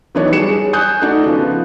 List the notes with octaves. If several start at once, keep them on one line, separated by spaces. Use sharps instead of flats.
E3 F#3 B3 D4 D#4 C#5
G3 G#4 C#7 E7
G#4
G#5 D#6 F#6 G6
A3 D4 D#4 F#4
C#3 F3 B3